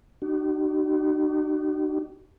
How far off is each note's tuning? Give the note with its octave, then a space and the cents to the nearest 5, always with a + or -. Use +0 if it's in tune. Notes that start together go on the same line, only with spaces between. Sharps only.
D#4 -40 F#4 +45